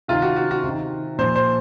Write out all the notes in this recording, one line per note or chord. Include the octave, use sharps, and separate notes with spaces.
C3 D#3 F4
F#4
F#4
F#4
C3 D#3
A#2 F3 C5
C5